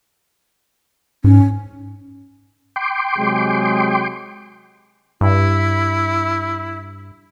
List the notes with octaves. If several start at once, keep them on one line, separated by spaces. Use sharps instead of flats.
G#2 C#4
G5 C6 D6
C3 F#3 G#3
G2 E4